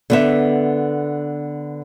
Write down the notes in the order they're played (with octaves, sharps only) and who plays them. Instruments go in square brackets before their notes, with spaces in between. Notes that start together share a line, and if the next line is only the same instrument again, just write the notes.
[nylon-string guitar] D3 B3 E5